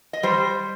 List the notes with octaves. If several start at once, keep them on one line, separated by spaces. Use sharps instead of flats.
D#5
G3 C5